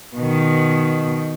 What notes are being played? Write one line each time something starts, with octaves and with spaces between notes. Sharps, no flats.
B2 D#3